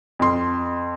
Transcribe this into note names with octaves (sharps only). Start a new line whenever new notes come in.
F2 C6